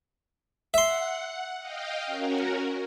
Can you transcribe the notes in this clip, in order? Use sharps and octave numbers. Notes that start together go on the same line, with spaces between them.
E5 F#5 C6
D#5 F5 G5
C#4 F#4 A#4